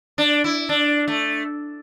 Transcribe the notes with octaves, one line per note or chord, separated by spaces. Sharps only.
D4
E4
D4
A3